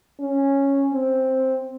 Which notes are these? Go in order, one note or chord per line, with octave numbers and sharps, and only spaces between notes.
C#4
C4